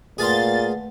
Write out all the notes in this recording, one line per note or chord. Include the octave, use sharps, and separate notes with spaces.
A#2 A3 G#4 B4 F5 F#5 C6 A6